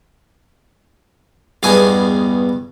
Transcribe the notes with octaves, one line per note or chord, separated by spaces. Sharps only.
E2 G2 B2 G#4 G#5 D#6